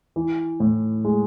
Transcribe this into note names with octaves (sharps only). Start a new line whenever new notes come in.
E3
A2
G#3